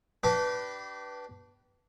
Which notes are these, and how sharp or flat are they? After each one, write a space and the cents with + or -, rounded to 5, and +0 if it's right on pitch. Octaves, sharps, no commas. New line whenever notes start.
D4 +0 G4 -30 B4 +0